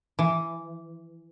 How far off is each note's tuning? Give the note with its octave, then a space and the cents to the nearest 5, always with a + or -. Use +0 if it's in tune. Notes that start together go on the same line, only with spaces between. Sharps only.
E3 +10